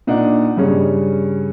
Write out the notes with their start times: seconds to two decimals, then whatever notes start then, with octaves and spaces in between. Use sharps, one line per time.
0.07 A#2 D4 D#4 F#5
0.57 G2 C#3 C#4